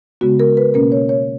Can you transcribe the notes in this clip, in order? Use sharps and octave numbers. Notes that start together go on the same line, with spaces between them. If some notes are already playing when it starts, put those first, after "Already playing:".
C#3 G#3 B3 F#4
A#4
B4
B2 A#3 C#4 A#4
C#5
C#5